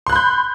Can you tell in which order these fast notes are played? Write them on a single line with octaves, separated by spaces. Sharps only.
C6 F#6 B5 G6